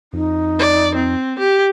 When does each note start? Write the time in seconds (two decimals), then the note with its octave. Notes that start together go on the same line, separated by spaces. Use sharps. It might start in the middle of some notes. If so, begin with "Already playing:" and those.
0.13 F2 D#4
0.59 D5
0.96 C4
1.39 G4